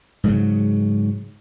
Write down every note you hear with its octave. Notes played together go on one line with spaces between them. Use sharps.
G#2 C#3 F#3